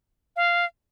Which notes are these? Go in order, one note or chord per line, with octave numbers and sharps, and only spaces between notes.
F5